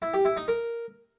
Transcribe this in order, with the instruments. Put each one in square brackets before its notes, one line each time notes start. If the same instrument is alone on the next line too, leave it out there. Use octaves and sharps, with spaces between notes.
[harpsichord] E4
G4
E4
D#4
A#4